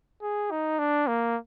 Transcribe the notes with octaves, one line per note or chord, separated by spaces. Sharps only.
G#4
D#4
D4
A#3